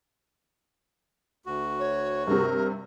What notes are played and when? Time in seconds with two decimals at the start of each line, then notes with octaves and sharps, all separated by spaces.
1.46 D2 F#4
1.79 C#5
2.27 G2 C3 A#4